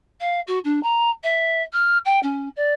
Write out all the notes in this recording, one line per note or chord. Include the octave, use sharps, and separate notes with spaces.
F5
F#4
D4
A#5
E5
F6
G5
C#4
D5